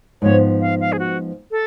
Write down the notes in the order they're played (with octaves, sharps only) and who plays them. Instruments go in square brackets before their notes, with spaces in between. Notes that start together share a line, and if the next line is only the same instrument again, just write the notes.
[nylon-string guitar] G#2 F3 B3 [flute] C#5
[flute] F5
F5
G#4
F#4
A4